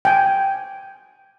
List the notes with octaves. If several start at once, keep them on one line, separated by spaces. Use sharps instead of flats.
G5 G#5